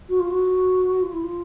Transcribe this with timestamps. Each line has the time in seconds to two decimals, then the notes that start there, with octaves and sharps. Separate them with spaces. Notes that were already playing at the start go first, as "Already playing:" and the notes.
0.09 F#4
0.20 F4
0.31 F#4
1.02 F4
1.13 E4
1.24 F4